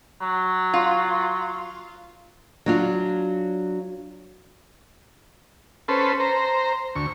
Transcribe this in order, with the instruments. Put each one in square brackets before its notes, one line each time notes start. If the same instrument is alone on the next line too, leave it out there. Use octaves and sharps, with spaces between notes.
[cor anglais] F#3
[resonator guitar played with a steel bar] F4
[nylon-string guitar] F#3 D4 F4
[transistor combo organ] C#4 A4 B4 C5
C5 A#5
D2 C#6